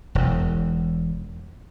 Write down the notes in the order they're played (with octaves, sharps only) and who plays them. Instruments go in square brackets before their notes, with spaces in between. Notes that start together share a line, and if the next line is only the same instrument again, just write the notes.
[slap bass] E1 E2